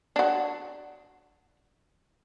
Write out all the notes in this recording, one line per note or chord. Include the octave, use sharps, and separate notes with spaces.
D4 F#4